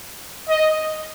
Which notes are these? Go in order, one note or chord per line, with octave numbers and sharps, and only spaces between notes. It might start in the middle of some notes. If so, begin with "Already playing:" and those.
D#5